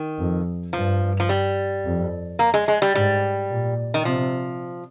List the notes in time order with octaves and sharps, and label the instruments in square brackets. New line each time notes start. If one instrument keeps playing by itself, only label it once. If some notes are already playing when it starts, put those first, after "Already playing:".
Already playing: [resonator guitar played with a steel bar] D#3
[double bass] F2
[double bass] G2 [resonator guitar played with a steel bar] F3
[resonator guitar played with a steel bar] F3
G3
[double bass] F2
[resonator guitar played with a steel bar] A#3
G#3
G#3
G3
[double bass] G#2 [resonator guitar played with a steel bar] G3
[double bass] A#2
[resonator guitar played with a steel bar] D#3
[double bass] C3 [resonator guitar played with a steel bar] F3